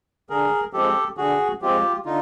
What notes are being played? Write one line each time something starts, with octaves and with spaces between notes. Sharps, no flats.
D3 G#4 A#4
F3 G#3 C4 G4 A4
D3 F#4 G#4
F3 G#3 C4 F4 G4
D3 D#4 F4